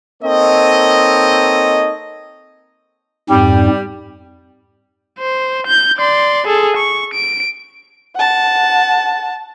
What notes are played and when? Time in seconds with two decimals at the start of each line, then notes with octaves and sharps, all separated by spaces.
0.23 A#3 C4 D#4 A4 C#5 D#5
3.30 F2 G#2 G3 C4
5.19 C5
5.67 G6
5.98 D5 C6
6.47 G#4 A4
6.77 C#6
7.14 D7
8.16 F#5 A5